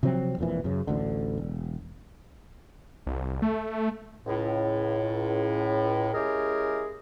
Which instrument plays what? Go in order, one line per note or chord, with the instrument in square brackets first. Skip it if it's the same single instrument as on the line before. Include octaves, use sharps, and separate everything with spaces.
[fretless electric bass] C3 F3 F#3 C4
E1 F2 A#2 E3
F#2 C#3
A1 D2 D3
E1
[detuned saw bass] C2
A3
[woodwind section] C#2 A2
G#3 C#4 E4 G4 G#4 A#4